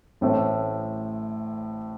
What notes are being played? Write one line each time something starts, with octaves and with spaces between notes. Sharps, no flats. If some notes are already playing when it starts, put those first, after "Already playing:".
A1 A2 A3 C4